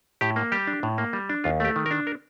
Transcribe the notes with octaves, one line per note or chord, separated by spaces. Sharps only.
A2 G4
A#3
G3 G4
D4
A2
A#3
G3
D4
D#2 F4
A3 G4
D#3
A#4
D4
A#4